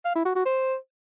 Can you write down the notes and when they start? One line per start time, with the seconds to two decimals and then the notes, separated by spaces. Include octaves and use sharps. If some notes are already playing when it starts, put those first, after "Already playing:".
0.05 F5
0.15 E4
0.25 F#4
0.35 F#4
0.45 C5